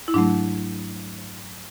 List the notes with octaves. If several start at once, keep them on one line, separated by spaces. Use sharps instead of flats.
E4
G#2 F#3 A3 D4